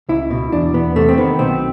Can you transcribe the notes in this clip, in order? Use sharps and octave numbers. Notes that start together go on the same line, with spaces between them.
C#2 E4
B2
E2 D4
E2 B3
C3 A3
C4
D#3 B3
B1 C4